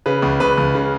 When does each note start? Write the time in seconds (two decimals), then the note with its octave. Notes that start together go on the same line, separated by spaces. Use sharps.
0.06 C#3 B4
0.22 C#2
0.40 C#2 B4
0.58 C#2
0.75 C#3